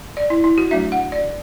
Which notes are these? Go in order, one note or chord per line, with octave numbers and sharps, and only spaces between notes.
D5
E4
E4
F#4
F#3 A3 D4 E5
F#5
D5